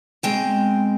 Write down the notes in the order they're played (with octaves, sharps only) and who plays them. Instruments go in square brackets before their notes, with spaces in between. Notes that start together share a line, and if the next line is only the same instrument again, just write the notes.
[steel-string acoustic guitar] B2 G#3 C4 G5